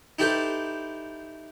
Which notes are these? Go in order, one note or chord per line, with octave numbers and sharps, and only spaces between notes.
D#4 E4 G4 A4 B4 C5